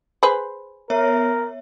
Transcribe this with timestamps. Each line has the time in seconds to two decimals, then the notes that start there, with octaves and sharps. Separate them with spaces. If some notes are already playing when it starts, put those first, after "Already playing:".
0.23 G#4 B4 C5
0.90 B3 A#4 C#5 E5